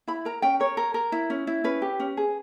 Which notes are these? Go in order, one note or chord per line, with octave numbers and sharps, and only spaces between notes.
E4 B5
A#4 A#5
C#4 G5
A#4 C#5
A#4
A#4
E4
C#4
E4
C#4 B4
G4
C#4
G#4